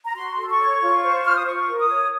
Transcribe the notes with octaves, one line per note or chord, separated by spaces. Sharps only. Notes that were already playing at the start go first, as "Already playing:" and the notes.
A#5
F#4 C6
A4
C#6
C#5
F4
C5
F4 F6
D#6
F4 C#6
A#4
D#6
C#5